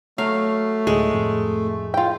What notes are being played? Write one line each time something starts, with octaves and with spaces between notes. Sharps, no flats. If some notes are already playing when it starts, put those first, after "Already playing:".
F#3 A3 F5
D1 G#3
F2 A2
F4 G5